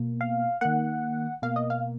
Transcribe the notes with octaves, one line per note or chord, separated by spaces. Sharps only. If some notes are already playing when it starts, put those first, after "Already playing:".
Already playing: B2 A#3
F5
D#3 A#3 F#5
B2 A#3 F5
D#5
F5